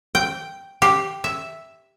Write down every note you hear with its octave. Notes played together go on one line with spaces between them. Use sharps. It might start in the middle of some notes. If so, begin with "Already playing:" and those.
G5
G4
E5